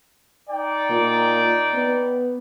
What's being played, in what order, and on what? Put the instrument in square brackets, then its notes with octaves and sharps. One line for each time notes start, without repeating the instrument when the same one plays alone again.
[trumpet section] D#4 D5 G5
[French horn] A#2
B3